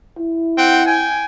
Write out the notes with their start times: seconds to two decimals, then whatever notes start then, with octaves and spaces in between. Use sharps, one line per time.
0.18 E4
0.56 C4 F#5 G5
0.86 G5 G#5